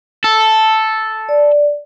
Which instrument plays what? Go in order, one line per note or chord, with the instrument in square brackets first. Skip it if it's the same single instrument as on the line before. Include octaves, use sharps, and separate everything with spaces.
[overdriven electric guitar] A4
[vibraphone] D5